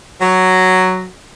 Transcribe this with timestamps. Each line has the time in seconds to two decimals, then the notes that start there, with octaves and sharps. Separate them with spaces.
0.21 F#3